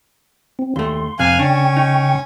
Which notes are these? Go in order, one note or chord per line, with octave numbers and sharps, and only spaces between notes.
C4
D#2 A3 C6
F2 C3 F5 G#5 F#6
C#3 C#4 D4 G5 C#6
D#4